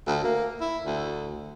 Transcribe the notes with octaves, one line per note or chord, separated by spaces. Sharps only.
D2
A#3
E4
D2